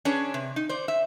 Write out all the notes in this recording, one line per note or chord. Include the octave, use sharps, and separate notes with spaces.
C#4 D4 G#4 B4 C#5
C3
D#4
C5 D5
E5